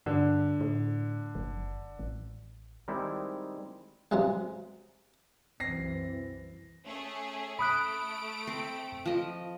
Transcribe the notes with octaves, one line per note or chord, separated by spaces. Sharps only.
G2 D3
A2
F#1
A1
D#3 G3 G#3 C4 D#4 E4
A1 G2 C3 F#3 G#3
C2 F#2 E3 C4 A#6 C7
A3 C#4 G#4
A3 B5 D#6 F#6 D7
C4
F3 D#5